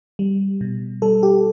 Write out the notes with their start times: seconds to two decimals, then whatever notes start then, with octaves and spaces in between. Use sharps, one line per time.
0.19 G3
0.61 B2
1.02 G3 A4
1.23 G4